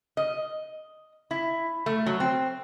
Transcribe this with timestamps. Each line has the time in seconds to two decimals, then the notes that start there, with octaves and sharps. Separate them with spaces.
0.17 D#5
1.31 E4
1.86 A3
2.06 F#3
2.20 C4